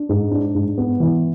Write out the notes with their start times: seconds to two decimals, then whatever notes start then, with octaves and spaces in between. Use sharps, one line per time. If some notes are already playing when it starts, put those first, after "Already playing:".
Already playing: D4
0.09 G#2
0.31 D4
0.55 G#2
0.78 B3
1.00 E3